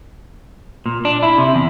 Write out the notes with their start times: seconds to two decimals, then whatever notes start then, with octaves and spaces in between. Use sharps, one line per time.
0.86 A#2
1.05 D4
1.23 E4
1.38 C3
1.55 E2